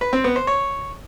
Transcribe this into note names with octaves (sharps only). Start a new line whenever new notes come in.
B4
C4
B3
C5
C#5